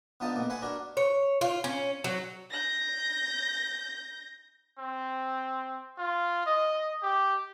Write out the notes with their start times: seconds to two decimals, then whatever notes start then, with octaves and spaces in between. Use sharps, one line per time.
0.20 D3 B3 D#4 F4 A5 D#6
0.36 B2 A#3
0.50 B4 F#5 G#5 C6
0.62 D4 F#4 A#4
0.97 C#5
1.41 F4
1.64 C#4
2.04 F#3
2.50 G6 A#6
4.79 C4
5.98 F4
6.46 D#5
7.03 G4